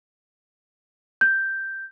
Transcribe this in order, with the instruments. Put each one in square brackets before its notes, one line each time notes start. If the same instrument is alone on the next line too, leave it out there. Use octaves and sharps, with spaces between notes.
[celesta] G6